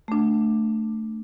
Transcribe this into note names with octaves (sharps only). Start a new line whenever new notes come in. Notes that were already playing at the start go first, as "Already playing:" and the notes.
A3 D4